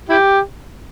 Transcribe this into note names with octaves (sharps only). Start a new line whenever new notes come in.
E4 G4